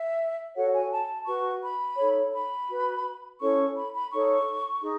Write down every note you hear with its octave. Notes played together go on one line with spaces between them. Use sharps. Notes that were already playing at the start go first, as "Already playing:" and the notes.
Already playing: E5
F#4 A4 C#5 F#5
G#5
A5
F#4 B4 C#6
B5
D#4 A4 C#5
B5
F#4 B4
C#4 E4 A4 C#5 C#6
B5
B5
D#4 A4 C#5 C#6
D#4 G#4